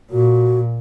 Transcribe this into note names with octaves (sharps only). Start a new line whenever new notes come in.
A#2 F#4